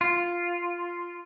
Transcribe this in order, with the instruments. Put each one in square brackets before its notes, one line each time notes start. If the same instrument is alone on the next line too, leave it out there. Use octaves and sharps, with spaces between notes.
[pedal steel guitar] F4